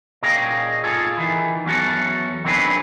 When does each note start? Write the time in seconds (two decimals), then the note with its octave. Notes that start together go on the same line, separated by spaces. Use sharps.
0.23 A#2 A#3 C#4 G#4 D#5 G5
0.84 F4 G#4 A4
1.17 D#3 E3
1.65 E2 F#3 C#4 F#4 A4
2.44 D#3 F#3 C4 D4 G#4 B4